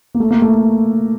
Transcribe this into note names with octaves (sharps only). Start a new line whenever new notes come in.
A#3
A3
A#3
A3